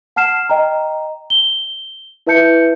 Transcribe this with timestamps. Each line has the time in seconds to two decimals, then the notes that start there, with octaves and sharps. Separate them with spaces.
0.16 F#5 A5 F6 C7 E7
0.49 D#5 G5 A#5
1.30 G7
2.27 E4 B4 E5 A5 G6 C#7